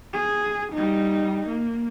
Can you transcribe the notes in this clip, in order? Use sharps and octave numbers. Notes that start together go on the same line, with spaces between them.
G#4
G3 D#4
A#3